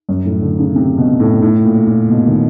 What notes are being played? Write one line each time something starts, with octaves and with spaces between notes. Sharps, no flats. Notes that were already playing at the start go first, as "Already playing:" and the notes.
F#2
A2
D3
C#3
C3
B2
A2
A2
A#2
A#2
B2
D#3